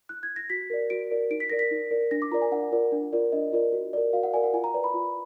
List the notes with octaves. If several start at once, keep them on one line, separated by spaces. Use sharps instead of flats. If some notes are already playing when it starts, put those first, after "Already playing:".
F#6
G#6
A#6
F#4 B6
A#4 D5
F#4 D7
A#4 D5
D#4 D7
B6
A#4 D5 A#6
B6
D#4
A#4 D5
D4 A#6
D6
F4 A#4 D5 A#5
G#5
D4 F#5
F4 A#4 D5
D4
F4 A#4 D5
D4 D#5
F4 A#4 D5
F#4
A#4 D5
F#4 F5
F#5
A#4 D5 G#5
F#5
F4 G#5
A#5
B4 D5
B5
F4